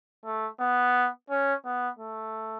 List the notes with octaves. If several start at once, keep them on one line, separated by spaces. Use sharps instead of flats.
A3
B3
C#4
B3
A3